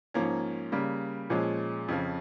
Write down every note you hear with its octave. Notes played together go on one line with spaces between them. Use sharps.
G#2 F3 A#3 C#4
C#3 G3 A#3
A#2 F3 G#3 C#4
F2 C#3 F3